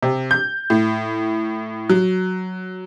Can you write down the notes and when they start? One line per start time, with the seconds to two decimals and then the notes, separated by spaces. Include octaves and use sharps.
0.03 C3
0.31 G6
0.70 A2
1.89 F#3